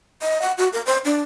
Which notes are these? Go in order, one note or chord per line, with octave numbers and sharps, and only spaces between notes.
D#5
F#5
F#4
A#4
C5
D4